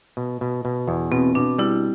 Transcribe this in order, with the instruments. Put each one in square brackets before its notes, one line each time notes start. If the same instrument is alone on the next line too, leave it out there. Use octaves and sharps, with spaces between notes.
[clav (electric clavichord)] B2
B2
B2
E2
[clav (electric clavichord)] B2 [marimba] C4
[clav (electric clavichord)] B2 [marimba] D4
[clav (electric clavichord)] G3 [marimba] E4